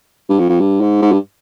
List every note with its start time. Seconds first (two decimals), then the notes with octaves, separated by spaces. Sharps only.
0.29 G2
0.39 F2
0.49 F2
0.60 G2
0.81 G#2
1.02 G#2
1.12 G2